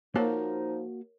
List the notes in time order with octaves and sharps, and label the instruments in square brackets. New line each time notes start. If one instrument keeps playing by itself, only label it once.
[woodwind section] F3 D#4 [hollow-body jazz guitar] A#3 F#4 A5 [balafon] A#4 C#5